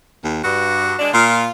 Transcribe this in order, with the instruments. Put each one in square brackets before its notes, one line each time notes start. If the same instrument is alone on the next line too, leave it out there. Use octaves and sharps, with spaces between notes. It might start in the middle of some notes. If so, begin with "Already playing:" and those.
[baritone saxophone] D#2
[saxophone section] G2 [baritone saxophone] F#4
[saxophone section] D3 G#3 D4
[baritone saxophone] A#2 [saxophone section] F4